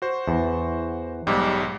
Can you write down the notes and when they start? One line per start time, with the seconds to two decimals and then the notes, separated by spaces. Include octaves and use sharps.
0.02 F#4 C5
0.28 E2
1.27 B1 G#2 G3